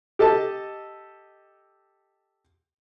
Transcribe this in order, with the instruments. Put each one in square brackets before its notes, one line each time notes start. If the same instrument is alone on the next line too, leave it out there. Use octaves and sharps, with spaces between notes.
[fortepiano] G4 A4 D#5 A5